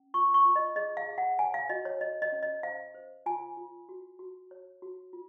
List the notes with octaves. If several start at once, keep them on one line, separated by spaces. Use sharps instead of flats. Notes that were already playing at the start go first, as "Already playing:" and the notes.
Already playing: C#4
F4 C#6
C#6
F4
D#5
G#4 D#5
F5
G#4
F#5
C#5 G#5
F5
F#4 D#5
C#5
C#5 D#5
D#5
C#4
D#5
C5 F5
C5
F4 G#5
F4
F#4
F#4
C#5
F#4
F4